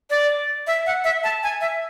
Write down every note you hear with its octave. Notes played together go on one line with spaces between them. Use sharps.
D5
E5
F#5
E5
A5
G#5
E5